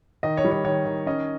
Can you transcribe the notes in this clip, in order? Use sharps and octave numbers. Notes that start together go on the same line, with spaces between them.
D#3 D#5
C#5
G3
C#5
D#3 C#5
D#3
C#4 D#5